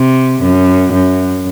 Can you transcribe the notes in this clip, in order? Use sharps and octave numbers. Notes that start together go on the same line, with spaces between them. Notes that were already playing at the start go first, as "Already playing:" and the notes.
Already playing: C3
F#2
F#2